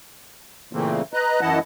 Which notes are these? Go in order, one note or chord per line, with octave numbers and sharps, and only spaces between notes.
A#2 C#3 E3 A3 A#3 C4
B4 D#5 A#5 F#6
F#2 E3 E4 D#5 F#5 A5